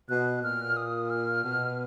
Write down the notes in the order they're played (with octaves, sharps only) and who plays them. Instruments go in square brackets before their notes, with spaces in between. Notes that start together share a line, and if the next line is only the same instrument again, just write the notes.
[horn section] B2 [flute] F#6
[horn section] A#2 [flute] F6
[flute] D#6
F6
[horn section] B2